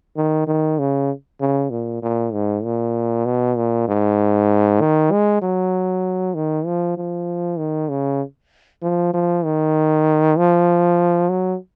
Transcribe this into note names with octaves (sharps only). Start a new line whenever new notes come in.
D#3
D#3
C#3
C#3
A#2
A#2
G#2
A#2
B2
A#2
G#2
D#3
G#3
F#3
D#3
F3
F3
D#3
C#3
F3
F3
D#3
F3
F#3